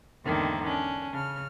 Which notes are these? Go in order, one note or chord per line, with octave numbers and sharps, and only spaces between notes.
E2 G#2 D3 D#3 A#3 C4
C#4 D4
C#3 F6